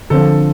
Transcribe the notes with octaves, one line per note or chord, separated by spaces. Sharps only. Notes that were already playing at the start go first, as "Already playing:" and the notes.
D3 F3 C4 A4